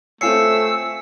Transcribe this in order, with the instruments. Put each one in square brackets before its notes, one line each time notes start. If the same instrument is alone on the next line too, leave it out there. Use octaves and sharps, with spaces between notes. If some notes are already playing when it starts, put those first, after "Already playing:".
[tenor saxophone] A3 [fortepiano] C4 F4 C#5 [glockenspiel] G#5 C7 C#7 [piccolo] E6